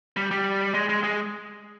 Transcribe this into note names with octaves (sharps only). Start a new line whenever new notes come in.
G3
G3
G#3
G#3
G#3